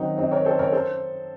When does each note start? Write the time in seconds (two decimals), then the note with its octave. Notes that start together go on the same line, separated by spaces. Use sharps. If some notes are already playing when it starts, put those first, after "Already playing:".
Already playing: D#3 F#3 C4 D#4
0.18 C4 D#4
0.31 A#4 C#5
0.45 A4 C5
0.59 A#4 C#5
0.72 A4 C5